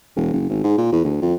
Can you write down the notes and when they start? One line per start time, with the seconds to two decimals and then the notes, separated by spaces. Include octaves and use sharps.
0.17 E1
0.33 F#1
0.49 G#1
0.64 G#2
0.78 A#2
0.92 E2
1.05 D2
1.22 F2